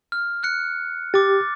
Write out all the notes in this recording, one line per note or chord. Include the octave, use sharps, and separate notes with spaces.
F6
F6 F#6 C#7
G4 D6 A6